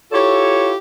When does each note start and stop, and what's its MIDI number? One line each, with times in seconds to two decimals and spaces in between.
0.12 0.75 64
0.12 0.75 65
0.12 0.75 67
0.12 0.75 69
0.12 0.75 73